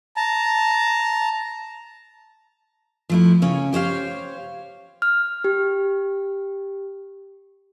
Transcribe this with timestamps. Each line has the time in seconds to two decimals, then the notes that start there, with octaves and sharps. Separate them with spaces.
0.17 A5 A#5
3.09 F3 A3 E4
3.42 C#3 C#4
3.73 G4 C5 C#5 F5
5.02 F6
5.44 G4